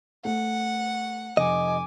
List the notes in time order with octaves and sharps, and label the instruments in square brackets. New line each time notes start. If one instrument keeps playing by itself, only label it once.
[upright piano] A3 [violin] F#5
[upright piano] F1 [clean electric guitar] D#5 [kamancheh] G#5 D6